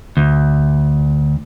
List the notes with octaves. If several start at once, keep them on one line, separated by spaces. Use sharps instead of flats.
D2